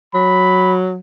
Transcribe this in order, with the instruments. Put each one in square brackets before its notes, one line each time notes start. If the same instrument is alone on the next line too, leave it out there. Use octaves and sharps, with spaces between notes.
[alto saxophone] F#3 [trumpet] B5